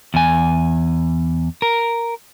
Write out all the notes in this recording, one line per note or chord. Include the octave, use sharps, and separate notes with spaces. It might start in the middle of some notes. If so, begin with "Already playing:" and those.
E2 G#5
A#4